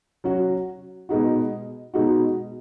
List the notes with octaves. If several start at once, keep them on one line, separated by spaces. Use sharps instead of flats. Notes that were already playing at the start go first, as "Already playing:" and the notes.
F#3 C#4 F#4
B2 G#3 D#4 F#4
B2 G#3 D#4 F#4